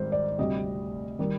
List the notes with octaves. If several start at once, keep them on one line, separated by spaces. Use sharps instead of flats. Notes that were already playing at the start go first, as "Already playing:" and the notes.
Already playing: G#1 G#2 D#3 G3 C5
D5
D2 C3 G3 D#5
D#3 G3